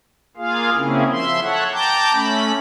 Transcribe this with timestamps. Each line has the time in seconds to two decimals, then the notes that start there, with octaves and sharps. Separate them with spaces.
0.37 A#3 F4 G#4 F5
0.75 C#3 A#3 C4 C#4 E4 G#4
1.11 F3 E5 C6
1.42 A4 C#5 E5 F#5
1.72 G5 A5 A#5 D6 G6
2.13 A3 C#4 B5